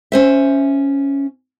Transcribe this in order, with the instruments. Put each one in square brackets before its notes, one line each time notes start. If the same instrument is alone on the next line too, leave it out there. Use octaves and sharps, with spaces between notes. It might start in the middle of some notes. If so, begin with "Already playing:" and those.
[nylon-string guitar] C#4 C5 E5